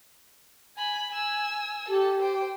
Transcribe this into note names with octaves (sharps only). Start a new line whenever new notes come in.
G#5 B5
G#5 E6
G4 A4
C5 G5